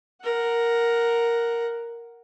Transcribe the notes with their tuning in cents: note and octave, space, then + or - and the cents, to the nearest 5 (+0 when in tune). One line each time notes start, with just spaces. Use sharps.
A#4 +0 F#5 +0